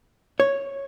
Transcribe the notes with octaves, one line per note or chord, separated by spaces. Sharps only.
C#5